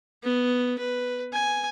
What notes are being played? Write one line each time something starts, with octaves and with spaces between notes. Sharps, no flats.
B3
B4
G#5